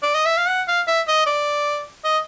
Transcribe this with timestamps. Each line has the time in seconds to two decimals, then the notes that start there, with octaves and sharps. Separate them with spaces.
0.03 D5
0.14 D#5
0.25 E5
0.37 F5
0.48 F#5
0.68 F5
0.87 E5
1.07 D#5
1.26 D5
2.04 D#5